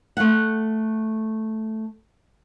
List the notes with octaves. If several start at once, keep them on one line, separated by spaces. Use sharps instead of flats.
A3 F#5